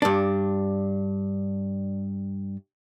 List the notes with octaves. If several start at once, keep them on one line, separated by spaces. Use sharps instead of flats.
G2 D4